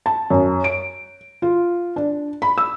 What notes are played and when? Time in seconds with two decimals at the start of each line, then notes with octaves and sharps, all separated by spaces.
0.06 A5
0.30 F#2
0.64 D7
1.42 F4
1.96 D4
2.42 B5
2.58 E6